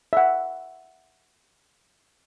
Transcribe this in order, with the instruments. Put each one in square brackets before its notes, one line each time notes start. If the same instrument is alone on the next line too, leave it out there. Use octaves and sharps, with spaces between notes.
[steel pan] E5 F#5